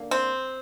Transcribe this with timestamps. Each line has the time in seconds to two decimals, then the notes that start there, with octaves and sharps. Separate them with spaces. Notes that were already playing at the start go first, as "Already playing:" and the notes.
Already playing: D3 A#3
0.11 C4